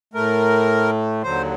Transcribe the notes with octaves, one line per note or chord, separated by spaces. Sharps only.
A2 A3 A#4
D#2 D3 F#3 C5